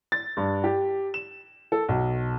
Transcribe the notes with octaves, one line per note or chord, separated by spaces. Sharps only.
A6
G2
G4
E7
A4
B1